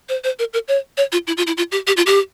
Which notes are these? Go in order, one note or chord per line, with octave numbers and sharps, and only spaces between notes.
C5
C5
A#4
A#4
C#5
C#5
F4
E4
F4
E4
F4
G4
G4
F4
G4